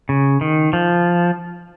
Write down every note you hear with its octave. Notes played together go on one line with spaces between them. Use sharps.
C#3
D#3
F3